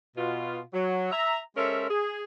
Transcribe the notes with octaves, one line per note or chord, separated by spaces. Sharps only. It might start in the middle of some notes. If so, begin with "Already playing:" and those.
B2 F4
F#3
E5 A#5
G#3 C#4 A4 A#4 C5 E5
G#4